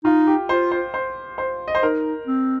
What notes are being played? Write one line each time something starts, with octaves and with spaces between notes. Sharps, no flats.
D#4 F4
G4
F4 C5
C5
C5
C5
D#5
C5
D#4 A#4
C4